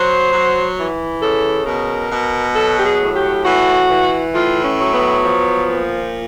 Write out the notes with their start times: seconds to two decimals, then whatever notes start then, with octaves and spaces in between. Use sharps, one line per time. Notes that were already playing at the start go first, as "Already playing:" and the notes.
Already playing: F#3 C5
0.33 F#3
0.77 E3
1.22 C#3 A4
1.66 B2 A#4
2.11 B2
2.55 F#3 A4
2.78 G4
2.85 G#4
3.00 A2
3.16 G4
3.44 E3 F#4
3.89 E3
4.34 A2 F4
4.64 C#4
4.79 F#3
4.94 B3
5.23 F3
5.68 A#2